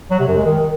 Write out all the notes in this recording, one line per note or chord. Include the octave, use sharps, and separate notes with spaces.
F#3
C3
F#2
G#3
D#3